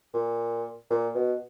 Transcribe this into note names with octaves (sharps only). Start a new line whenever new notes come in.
A#2
A#2
B2